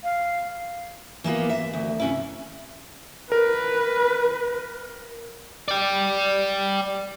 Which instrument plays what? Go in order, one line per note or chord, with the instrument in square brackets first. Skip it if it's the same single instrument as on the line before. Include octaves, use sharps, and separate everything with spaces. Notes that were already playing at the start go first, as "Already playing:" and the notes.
[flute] F5
[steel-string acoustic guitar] E3 A#3 B3 F4
E5
D2
C3 C#4 E4
[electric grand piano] A#4 [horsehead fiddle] B4
[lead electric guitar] D5 G5